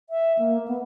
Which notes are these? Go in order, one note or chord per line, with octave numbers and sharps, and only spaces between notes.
E5
A#3
B3